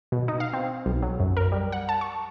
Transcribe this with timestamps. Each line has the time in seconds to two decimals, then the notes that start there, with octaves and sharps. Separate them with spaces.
0.12 B2
0.28 D#4
0.40 F5
0.53 C4
0.86 B1
1.02 F#3
1.20 F#2
1.37 A#4
1.52 G3
1.72 F#5
1.89 A5
2.01 C#6